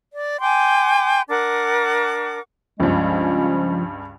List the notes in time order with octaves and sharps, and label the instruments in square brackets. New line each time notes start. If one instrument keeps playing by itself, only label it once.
[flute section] D5
G5 G#5 C6 D6
D4 A#4 F#5 D6
[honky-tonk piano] C#2 G2 [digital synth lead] F3 [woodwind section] G#3 C#4